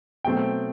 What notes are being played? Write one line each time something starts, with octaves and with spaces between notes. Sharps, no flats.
B2 F#3 A3 C4 G5